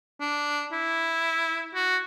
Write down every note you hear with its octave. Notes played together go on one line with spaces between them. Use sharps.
D4
E4
F#4